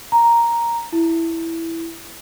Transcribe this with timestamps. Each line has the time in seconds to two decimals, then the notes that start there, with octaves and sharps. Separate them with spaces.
0.12 A#5
0.93 E4